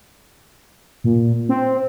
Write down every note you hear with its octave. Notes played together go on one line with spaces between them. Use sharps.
A#2
C4